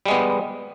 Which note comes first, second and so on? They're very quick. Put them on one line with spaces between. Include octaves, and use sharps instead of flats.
G3 G#3 B3